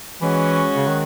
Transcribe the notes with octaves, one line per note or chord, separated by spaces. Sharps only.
E3 G#3 C#4 F#4
C#3
D#3